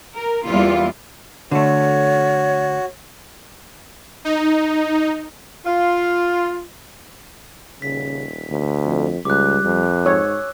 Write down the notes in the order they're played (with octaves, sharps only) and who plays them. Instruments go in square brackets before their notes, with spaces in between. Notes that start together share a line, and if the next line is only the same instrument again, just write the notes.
[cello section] A#4
E2 G3 A#3 E4 F4
[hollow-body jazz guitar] D3 A3 [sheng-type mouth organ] F#4 [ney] C#5
[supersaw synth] D#4
[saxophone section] F4
[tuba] D#1 [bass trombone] C#3 [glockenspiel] B6
[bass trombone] D2
[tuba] F2
[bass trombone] C#2 [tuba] G3 [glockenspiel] D6 F#6
[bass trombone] F2
[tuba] G#2 [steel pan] C#5 [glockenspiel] E6